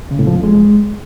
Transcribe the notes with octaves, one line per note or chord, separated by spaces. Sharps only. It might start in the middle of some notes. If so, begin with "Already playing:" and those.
C#3
A2
F3
F2
G#3